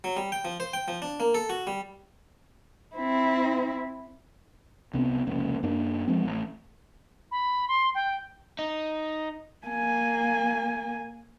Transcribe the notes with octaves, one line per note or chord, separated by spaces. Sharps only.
F#3
G3
G5
F3
C5
G5
F3
D4
A#3
A4
F#4
G3
C4 E4
C2 C3 B3 C4
F1 C#2 A#3 C#4
F#2 A#3 D4
F3 G#3 C4
A1
B5
C6
G5
D#4
A#3 G#5